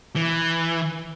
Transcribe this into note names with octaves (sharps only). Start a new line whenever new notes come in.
E3